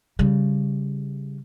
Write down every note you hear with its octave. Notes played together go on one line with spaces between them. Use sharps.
C#3 G3